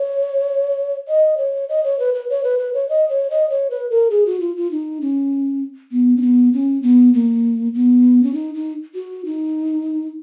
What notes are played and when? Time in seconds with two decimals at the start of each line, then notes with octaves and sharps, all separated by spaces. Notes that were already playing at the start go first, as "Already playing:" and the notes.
Already playing: C#5
1.08 D#5
1.38 C#5
1.69 D#5
1.84 C#5
1.99 B4
2.14 B4
2.30 C#5
2.44 B4
2.59 B4
2.74 C#5
2.89 D#5
3.09 C#5
3.30 D#5
3.50 C#5
3.70 B4
3.90 A#4
4.10 G#4
4.26 F#4
4.40 F4
4.56 F4
4.71 D#4
5.01 C#4
5.91 B3
6.17 C#4
6.22 B3
6.53 C#4
6.82 B3
7.14 A#3
7.74 B3
8.23 C#4
8.34 D#4
8.54 D#4
8.94 F#4
9.25 D#4